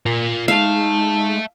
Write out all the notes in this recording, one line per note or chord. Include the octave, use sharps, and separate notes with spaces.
A#2 F4 A#4
G#3 D#4 E5 F5 A5